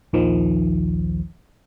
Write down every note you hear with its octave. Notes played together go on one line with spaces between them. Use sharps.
A#1 D#2 D#3 F3